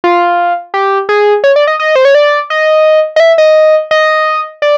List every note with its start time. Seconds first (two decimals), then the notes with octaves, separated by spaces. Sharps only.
0.04 F4
0.74 G4
1.09 G#4
1.44 C#5
1.56 D5
1.67 D#5
1.80 D#5
1.96 C5
2.05 C#5
2.15 D5
2.50 D#5
3.16 D#5
3.20 E5
3.38 D#5
3.91 D#5
4.62 D5